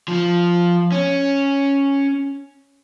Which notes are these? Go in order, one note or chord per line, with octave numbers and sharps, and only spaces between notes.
F3
C#4